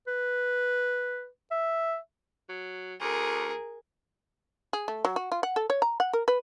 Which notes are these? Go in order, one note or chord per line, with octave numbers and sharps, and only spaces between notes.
B4
E5
F#3
D2 G#4 A#4
G#4
A3
F#3
F#4
F4
F#5
A4
C#5
A#5
F#5
A#4
B4